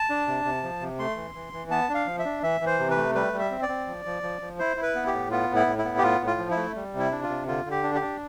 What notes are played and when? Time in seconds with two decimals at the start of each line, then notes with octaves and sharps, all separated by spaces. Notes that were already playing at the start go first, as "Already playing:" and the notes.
Already playing: A5
0.09 D4
0.27 C3
0.45 C3
0.63 F3
0.81 C3
0.99 A3 C6
1.16 E3
1.34 E3
1.53 E3
1.70 B3 A5
1.89 D4
1.95 F5
2.07 F3
2.19 E5
2.25 D4
2.43 E3 E5
2.61 E3
2.66 C5
2.79 C3
2.91 B4
2.97 A3
3.15 G3 B4
3.33 G3
3.39 E5
3.51 C4
3.63 D5
3.69 C4
3.87 F3
4.05 F3
4.23 F3
4.41 F3
4.59 E4 C5
4.77 E4
4.82 B4
4.95 B3
5.07 G4
5.13 A2
5.31 B3 F4
5.49 A2
5.56 E4
5.66 A2
5.79 E4
5.85 B3
5.98 G4
6.03 A2 F4
6.20 A2
6.26 F4
6.39 F3
6.51 E4
6.56 A3
6.75 G3
6.93 C3
6.99 E4
7.12 D4
7.23 F4
7.28 C3
7.47 D3 F4
7.65 D3
7.71 G4
7.83 D4
7.95 G4
8.01 D4